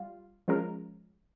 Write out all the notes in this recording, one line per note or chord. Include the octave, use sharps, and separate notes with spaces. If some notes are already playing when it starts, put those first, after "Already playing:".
Already playing: G3 F4
F3 G#3 C#4 F4 A#4